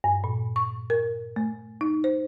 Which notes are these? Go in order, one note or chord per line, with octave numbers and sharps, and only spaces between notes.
G2
A#2
C#6
A#4
A3
D#4
C5